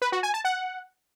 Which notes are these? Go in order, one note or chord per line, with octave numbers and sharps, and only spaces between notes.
B4
F#4
G#5
A5
F#5